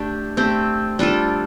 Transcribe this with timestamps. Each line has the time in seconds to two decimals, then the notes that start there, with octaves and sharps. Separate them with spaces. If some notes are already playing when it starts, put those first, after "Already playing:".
Already playing: A3 D4 G4
0.37 A3 C4 G4
0.99 G3 D4 F4 A4